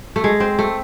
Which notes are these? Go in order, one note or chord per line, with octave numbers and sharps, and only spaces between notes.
A3
G#3
C4
A3